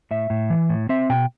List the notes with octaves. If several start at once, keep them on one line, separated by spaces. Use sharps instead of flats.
A2 E5
A2
E3
A2
C4 E5
B2 G5